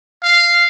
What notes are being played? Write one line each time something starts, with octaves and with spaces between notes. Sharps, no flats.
F5